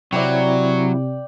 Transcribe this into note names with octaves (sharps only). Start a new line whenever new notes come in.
C3 F#3 C4 E4 D5 G5